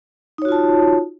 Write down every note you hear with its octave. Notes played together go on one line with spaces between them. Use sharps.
D#4 F4 F#4 C#5 A5